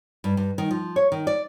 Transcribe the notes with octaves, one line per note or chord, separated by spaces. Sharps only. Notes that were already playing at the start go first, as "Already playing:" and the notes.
G2
G2
D#3
F3
C#5
D#3
D5